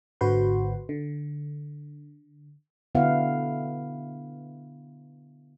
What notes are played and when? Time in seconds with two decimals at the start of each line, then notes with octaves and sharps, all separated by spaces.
0.21 G#1 D3 F#4 B4 C5 C6
0.89 D3
2.95 D3 B3 E4 F5 F#5